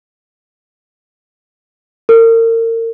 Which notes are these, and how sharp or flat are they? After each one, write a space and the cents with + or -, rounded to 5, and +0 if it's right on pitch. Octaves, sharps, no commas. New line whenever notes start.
A#4 -35